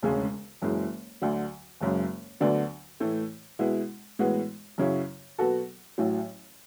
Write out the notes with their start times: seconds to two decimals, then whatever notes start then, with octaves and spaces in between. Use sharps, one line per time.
0.03 E1 D2 C#3 G#3 C#4
0.62 F#1 F#2 E3 G#3
1.21 D2 D3 F#3
1.81 F#1 F#2 C#3 G#3
2.40 D2 D3 F#3 B3 D4
3.00 A2 E3 A3
3.59 B2 G#3 B3 E4
4.19 A2 E3 G#3 B3 F#4
4.78 F#2 C#3 F#3 C#4 E4
5.38 B2 F#3 B3 F#4 A4
5.98 A1 A2 F#3